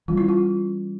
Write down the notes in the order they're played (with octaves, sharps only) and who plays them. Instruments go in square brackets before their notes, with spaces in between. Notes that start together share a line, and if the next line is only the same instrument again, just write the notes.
[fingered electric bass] E3 G3 A#3 C#4 [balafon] F4
[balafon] E4
F4